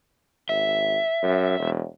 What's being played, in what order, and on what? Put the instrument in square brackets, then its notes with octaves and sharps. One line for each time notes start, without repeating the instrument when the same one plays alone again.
[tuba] G#1 [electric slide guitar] E5
[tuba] F#2
E1